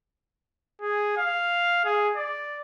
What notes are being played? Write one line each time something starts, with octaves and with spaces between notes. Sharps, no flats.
G#4
F5
G#4
D5